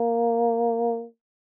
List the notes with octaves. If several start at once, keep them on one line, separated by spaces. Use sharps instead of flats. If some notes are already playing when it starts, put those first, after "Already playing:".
Already playing: A#3